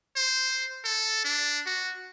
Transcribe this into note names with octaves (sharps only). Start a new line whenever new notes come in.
C5
A4
D4
F#4